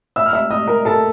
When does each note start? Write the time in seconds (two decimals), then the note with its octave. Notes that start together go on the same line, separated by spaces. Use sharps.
0.16 E5 E6
0.26 F6
0.33 E5 E6
0.51 D#5 D#6
0.68 A#4 A#5
0.85 A4 A5